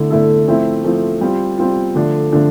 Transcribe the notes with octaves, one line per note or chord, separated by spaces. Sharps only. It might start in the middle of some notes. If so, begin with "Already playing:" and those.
Already playing: D3 A3 E4 A4
D3 A3 E4 A4
F3 A3 C4 E4
F3 A3 C4 E4
G3 C4 F4
G3 C4 F4
D3 F3 A3 D4
D3 F3 A3 D4